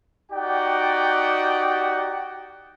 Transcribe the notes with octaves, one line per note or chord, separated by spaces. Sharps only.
D#4 F#4 G4 D5 F#5 G5